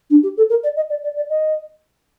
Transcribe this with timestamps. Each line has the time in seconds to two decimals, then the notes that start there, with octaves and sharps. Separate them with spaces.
0.10 D4
0.23 G4
0.37 A4
0.49 A#4
0.63 D5
0.76 D#5
0.89 D5
1.03 D5
1.16 D5
1.29 D#5